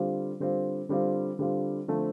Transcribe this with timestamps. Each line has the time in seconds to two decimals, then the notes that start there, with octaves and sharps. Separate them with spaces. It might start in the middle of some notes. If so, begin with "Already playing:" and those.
Already playing: D3 G3 C4 F4
0.40 D3 G3 C4 F4
0.89 D3 G3 C4 F4
1.39 D3 G3 C4 F4
1.88 D3 F3 A3 C4